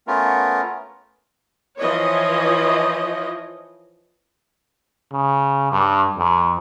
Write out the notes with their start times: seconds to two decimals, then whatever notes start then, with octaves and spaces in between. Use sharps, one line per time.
0.07 A3 B3 C#4 F4 A#4
1.78 E3 F3 C#5 D#5
5.12 C#3
5.72 G2
6.18 F2